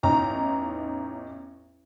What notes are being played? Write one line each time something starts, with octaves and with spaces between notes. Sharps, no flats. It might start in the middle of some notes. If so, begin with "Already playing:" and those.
A1 E2 D#4 A#5